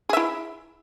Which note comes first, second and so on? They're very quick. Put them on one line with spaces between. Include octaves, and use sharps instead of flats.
G#4 E5 E4